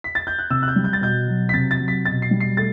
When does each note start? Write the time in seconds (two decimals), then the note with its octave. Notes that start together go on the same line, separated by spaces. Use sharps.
0.04 B6
0.15 A6
0.27 G6
0.39 F#6
0.50 C3 E6
0.63 F#6
0.68 G6
0.76 G3
0.84 G6
0.93 A6
1.01 B2 G6
1.28 F#3
1.49 B6
1.54 C3 A6
1.71 A6
1.80 F#3
1.88 B6
2.05 B2 A6
2.22 C7
2.31 G3
2.40 C7
2.57 A3 A6